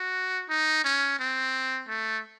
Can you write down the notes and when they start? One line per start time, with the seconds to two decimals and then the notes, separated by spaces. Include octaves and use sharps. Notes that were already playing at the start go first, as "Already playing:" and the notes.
Already playing: F#4
0.49 D#4
0.84 C#4
1.19 C4
1.88 A3